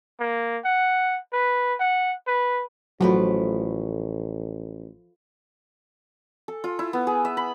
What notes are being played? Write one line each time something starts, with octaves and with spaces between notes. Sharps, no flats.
A#3
F#5
B4
F#5
B4
A1 F3 F#3 A3 F#4 B4
A4
F4
E4
B3
G#4
E5
B5